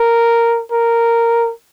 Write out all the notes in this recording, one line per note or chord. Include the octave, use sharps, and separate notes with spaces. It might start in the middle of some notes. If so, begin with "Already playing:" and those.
Already playing: A#4
A#4